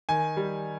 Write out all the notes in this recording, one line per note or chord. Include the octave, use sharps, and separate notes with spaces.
D#3 G#5
G3